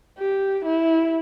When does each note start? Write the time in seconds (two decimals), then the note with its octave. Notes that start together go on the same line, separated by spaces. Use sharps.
0.19 G4
0.65 E4